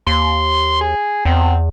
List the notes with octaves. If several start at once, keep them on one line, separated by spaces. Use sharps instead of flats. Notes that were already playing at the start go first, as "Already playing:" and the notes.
D#2 C6
G#4
E2 C4